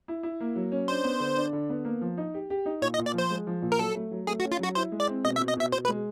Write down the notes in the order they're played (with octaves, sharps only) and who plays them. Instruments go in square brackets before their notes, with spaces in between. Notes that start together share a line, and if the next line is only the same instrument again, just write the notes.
[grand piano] E4
E4
A#3
F#3
C#4
[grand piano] D4 [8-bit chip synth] C5
[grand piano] B3
D3
D4
D3
B3
A#3
F3
D#4
G4
G4
D#4
[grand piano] A#2 [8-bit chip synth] C#5
[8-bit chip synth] D#5
[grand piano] A#2
[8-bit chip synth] D5
[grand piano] F3 [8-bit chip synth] C5
[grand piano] G#3
F3
A#2
[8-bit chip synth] A#4
[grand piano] F#3 [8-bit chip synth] A4
[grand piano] A3
F#3
[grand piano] A3 [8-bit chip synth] G#4
[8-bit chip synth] F#4
[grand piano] C#4
[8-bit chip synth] F4
[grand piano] F#3 [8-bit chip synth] F#4
[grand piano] E4 [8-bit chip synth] C5
[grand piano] G#3
[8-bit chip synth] D5
[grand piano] C4
[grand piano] B2 [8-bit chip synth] D#5
[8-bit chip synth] E5
[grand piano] B2
[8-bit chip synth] D#5
[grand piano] B2 [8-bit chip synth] E5
[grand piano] B2 [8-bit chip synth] C5
[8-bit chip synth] B4
[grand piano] G#3